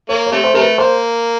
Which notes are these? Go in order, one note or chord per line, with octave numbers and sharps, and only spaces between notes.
A#3 C#5
C#5
C3 A3
C5
C3 A3 A#4
B4
A#3 C5